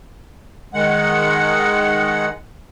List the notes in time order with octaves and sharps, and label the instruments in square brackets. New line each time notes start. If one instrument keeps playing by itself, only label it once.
[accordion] D#3 G#3 F#5